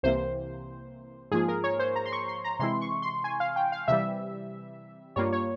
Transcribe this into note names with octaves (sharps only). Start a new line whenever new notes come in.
C2 C3 E3 A#3 C5
G#2 F3 A#3 F4 G#4
A#4
C#5
C5
A#5
C6
C#6
C6
A#5
C3 E3 G#3 E4 C6
C#6
C6
G#5
F5
G5
F5
C3 E3 G3 E5
G2 G3 A#3 F4 C#5
C#5